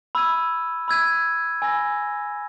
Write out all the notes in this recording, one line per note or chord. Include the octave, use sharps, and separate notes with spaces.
B5 E6 G#6 D#7
B5 E6 G#6 D#7
G#5 B5 E6 A#6